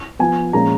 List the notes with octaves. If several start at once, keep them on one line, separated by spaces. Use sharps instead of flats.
F3 B3 G#5
A#2 F3 G#3 C#4 A#5